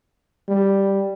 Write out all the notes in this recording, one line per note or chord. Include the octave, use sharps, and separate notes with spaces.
G3